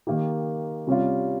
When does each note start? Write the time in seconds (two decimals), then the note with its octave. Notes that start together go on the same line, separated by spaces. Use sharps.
0.07 D#3 A#3 D#4 G4
0.87 C3 G3 C#4 F4